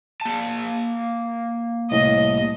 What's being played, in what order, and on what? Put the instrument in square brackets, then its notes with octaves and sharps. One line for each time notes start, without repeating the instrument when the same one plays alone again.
[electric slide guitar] A#3 A5
[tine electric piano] C2 A2 [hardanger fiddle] D#5